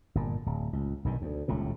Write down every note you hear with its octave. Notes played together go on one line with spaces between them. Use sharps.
G1 A#2
D1
C#2
B1 G2 D#3
D2
D#1 C#2 A2